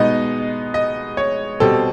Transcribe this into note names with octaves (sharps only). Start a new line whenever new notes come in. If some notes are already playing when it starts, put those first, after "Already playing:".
Already playing: B2 G#3 B3 D#4 D#5
D#5
C#5
B2 G3 C4 A4